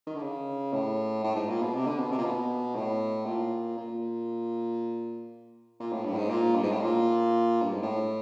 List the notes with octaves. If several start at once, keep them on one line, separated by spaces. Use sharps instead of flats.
D#3
D3
C#3
A2
A2
G#2
A#2
B2
C3
D3
B2
C3
A#2
B2
A2
A#2
A#2
A#2
A2
G2
A2
G#2
A#2
G2
G#2
A2
A#2
G2
G#2
A2